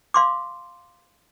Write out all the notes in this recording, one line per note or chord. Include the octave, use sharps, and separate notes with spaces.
F5 C6 D6